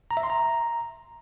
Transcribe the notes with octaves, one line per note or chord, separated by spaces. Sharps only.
A#5
E5
C6
A#5